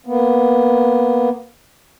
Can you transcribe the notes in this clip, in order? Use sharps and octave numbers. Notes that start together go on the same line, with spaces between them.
A#3 B3